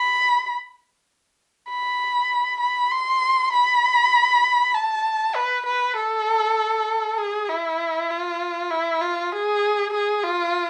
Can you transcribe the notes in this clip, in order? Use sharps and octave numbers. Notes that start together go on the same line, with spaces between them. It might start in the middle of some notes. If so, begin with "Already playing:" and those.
Already playing: B5
B5
B5
C6
B5
A5
B4
B4
A4
G#4
E4
F4
E4
F4
G#4
G#4
F4